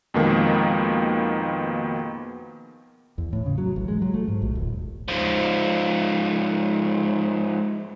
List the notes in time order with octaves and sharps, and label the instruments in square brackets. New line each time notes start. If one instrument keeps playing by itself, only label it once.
[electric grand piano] F2 B2 D#3 G#3 A#3 B3
[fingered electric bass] E2
A2
C#3
F#3
A1
G#3
F#3
A3
G#2
A#1
D#1
[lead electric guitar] G#2 F3